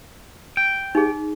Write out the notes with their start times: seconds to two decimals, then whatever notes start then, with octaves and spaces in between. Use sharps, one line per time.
0.57 G5
0.95 D#4 G#4